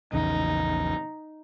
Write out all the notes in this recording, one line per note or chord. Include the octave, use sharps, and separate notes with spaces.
A#1 E2 C#3 D#4